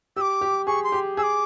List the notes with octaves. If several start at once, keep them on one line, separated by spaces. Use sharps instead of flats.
G4 D6 E6
G4
G#4 C#6
C6
G4
G#4 E6
D6